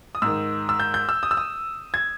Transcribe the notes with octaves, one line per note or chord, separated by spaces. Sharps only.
D#6
G#2 D#3 E6
E6
G6
G6
E6
D#6
E6
D#6
G#6